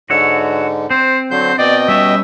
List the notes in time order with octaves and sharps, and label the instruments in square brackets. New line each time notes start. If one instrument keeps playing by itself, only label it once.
[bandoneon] G#2 D3 [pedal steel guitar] F#4 C#5 E5
[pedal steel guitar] C4 [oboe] C5
[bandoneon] D3 F#3 G6 [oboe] C5
[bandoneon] B2 D#5 G5 [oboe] D5
[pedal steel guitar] G3 C#4 [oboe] E5